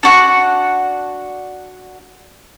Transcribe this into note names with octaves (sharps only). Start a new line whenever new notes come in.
D4 F#4 F#5